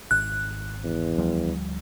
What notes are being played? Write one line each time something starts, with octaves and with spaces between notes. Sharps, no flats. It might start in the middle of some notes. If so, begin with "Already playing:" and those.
G#1 F#6
E2
D2 F3 G3